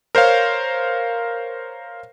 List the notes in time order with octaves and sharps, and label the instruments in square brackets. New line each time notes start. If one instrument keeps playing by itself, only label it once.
[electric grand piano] A#4 C5 C#5 F5